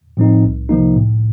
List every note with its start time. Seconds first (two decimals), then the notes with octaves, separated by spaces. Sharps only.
0.17 A2 F3 C4 D#4
0.43 C2
0.69 C3 F3 A#3 D#4
0.95 A2